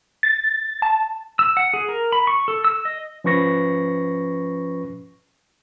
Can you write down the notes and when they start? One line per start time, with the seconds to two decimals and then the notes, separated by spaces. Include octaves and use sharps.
0.23 A6
0.82 A5
1.39 E6
1.57 F#5
1.74 G#4
1.89 A#4
2.12 B5
2.27 C#6
2.48 A4
2.64 E6
2.85 D#5
3.24 F3 C#4 B4 C#6 A#6